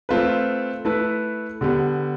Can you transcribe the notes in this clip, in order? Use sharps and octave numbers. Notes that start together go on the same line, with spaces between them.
A3 C4 F4 B4
A3 E4 B4
D3 G3 B3